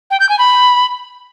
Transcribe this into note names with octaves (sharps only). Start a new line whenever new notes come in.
G5
G6
G#5
B5